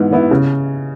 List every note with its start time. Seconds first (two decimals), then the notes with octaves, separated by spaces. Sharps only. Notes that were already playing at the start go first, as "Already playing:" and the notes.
Already playing: G#2 E3 B3 E4
0.11 E3 B3 E4
0.31 C#3